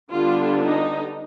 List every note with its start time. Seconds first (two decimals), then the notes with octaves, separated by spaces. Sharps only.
0.10 D3 G3 B3 D4 F4
0.63 D#4